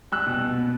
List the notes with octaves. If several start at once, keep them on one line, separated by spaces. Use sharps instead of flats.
G3 E6 F#6
B2
B2
B3